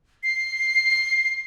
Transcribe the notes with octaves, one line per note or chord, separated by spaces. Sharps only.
C7